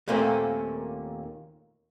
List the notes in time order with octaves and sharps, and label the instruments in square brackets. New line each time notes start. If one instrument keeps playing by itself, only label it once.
[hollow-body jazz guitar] D#2 A#2 A3 A#3 C4 C#4